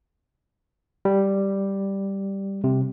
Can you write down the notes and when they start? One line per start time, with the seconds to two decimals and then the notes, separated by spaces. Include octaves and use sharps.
1.05 G3
2.64 C3